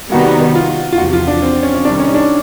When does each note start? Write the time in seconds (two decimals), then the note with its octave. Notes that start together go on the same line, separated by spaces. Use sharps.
0.12 C3 D#3 G3 B3 D#4 F#4
0.55 F4
0.93 F4
0.98 E2 C3 F3 F#4
1.13 F4
1.28 D4
1.42 C4
1.63 C#4
1.75 C#4
1.85 C3 D#3 G3 D4
2.00 C#4
2.07 D#4
2.14 D4